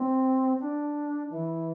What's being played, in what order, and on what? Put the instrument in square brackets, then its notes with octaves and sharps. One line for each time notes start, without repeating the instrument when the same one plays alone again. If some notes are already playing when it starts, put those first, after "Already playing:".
Already playing: [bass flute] C4
D4
E3